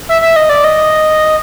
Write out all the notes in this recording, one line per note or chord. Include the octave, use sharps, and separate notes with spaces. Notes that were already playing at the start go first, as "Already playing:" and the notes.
E5
E5
D#5
D5
D#5